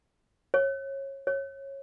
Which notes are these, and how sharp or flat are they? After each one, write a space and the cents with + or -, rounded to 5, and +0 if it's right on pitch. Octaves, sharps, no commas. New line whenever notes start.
C#5 -25
C#5 -20